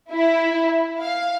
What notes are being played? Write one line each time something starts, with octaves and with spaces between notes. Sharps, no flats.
E4
F5